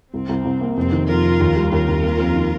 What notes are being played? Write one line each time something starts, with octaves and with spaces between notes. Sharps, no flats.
C2 C4
C2
C2
A#3
F1 C4
D#3
F2 F4 A#4
F2
D#2
G3
D#2 F4 A#4
D#2
A#3
F2
D#3